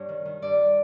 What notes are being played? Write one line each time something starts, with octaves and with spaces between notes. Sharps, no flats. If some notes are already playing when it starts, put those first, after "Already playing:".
Already playing: G2 C#5
D#3
D#3
G2 D5